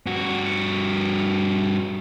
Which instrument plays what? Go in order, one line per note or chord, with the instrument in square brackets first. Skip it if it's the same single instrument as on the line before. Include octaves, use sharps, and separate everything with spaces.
[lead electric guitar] G2 F#4